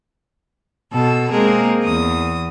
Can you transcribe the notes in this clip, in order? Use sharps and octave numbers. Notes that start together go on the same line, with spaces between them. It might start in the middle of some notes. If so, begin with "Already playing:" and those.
B2 A4 E6
G#3 A#3 C4 G#4 A#4
E2 D#6